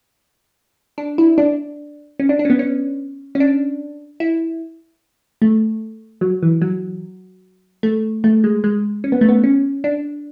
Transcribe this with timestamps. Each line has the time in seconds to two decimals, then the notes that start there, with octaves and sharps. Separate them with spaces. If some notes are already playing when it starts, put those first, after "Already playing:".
0.98 D4
1.18 E4
1.38 D4
2.20 C#4
2.29 D4
2.39 D4
2.45 C#4
2.50 B3
2.59 C#4
3.35 C#4
3.40 D4
4.20 E4
5.42 A3
6.21 F#3
6.43 E3
6.62 F#3
7.83 A3
8.24 A3
8.44 G#3
8.64 G#3
9.04 C#4
9.12 B3
9.21 A3
9.29 B3
9.44 C#4
9.84 D4